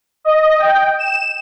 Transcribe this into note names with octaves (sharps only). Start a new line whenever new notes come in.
D#5
G5
E7